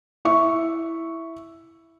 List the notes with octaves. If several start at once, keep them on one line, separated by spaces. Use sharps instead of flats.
E4 E5 C#6